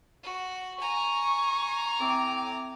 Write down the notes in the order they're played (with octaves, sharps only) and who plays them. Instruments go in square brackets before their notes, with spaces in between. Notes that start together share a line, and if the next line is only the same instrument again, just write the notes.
[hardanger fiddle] F#4
[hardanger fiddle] G#5 A#5 [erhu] C#6
[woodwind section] A2 C4 D6